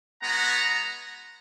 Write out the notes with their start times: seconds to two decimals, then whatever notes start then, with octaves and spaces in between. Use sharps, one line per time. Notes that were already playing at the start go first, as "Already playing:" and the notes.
0.22 G#3 B3 F#4 F#5 A#5